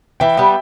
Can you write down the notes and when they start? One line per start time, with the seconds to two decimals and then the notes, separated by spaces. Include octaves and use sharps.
0.20 E3 E5 G5
0.37 G3 B3